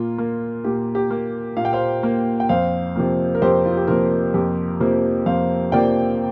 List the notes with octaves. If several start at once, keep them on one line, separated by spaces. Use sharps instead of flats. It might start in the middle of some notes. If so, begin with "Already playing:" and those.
Already playing: A#2 A#3 F4
A#3
A#2 G4
G4
A#3
A#2 F5
G5
C5 F5
A#3
G5
F2 C5 F5
C3 F3 A#3
A#4
F2 G4 C5
F4
G4
C3 F3 A#3 F4 A#4
F2 G4
C3 F3 A#3
F2 C5 F5
C3 F3 A#3 D5 G5